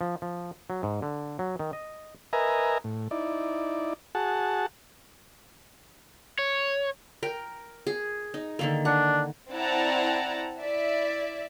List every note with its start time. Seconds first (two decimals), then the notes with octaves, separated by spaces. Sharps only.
0.01 F3
0.22 F3
0.70 F#3
0.83 G#2
1.02 D3
1.39 F#3
1.59 D#3
1.73 D#5
2.33 A#4 B4 D#5 E5 G#5 A#5
2.84 A2
3.11 D#4 E4 D5
4.15 F#4 G#4 F#5 A5
6.39 C#5
7.23 A#4 G5
7.87 G#4
8.34 D#4
8.59 D3 D#3 A#3
8.85 D4 F#5
9.51 C4 E4 D5 F#5 A5 A#5
10.59 E4 D5 E5